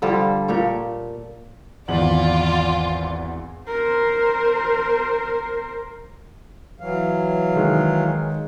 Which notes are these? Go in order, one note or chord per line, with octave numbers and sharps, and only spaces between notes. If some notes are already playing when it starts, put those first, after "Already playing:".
D3 F3 G3 A4
A#2 G4 A4 C#5
G#1 E2 F4 D5 F#7
A#4 C5
E3 F#3 F5
D#3 G#3